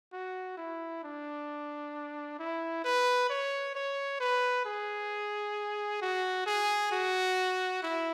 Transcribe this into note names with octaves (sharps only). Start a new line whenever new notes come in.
F#4
E4
D4
E4
B4
C#5
C#5
B4
G#4
F#4
G#4
F#4
E4